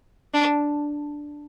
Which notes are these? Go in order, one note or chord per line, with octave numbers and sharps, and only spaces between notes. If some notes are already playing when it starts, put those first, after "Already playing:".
D4